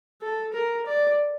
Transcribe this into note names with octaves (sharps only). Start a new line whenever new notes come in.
A4
A#4
D5